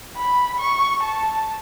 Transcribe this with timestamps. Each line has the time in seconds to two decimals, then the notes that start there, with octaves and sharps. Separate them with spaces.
0.17 B5
0.60 C#6
1.03 A5